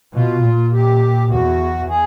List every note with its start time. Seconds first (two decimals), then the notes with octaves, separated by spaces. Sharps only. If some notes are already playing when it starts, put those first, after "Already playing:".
0.14 B2 F4
0.42 A#2
0.72 G4
1.29 E2 F#4
1.88 G#4